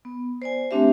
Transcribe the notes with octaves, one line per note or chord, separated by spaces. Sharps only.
B3
C5 D5 G#5
A3 C4 D4 G4 E5